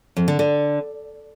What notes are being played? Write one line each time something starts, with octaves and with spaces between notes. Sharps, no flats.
F2
D3
D3